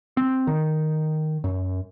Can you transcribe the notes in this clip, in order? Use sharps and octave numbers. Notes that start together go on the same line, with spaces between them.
C4
D#3
F#2